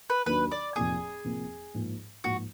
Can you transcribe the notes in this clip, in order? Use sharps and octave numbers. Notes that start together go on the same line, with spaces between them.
B4
D#2 D#3 F#3 A#3 D4 B4
D5
F1 F2 F3 A#3 G#4
F1 F2 F3 A#3
G#2 F3 A#3
G#2 F3 A#3 F#4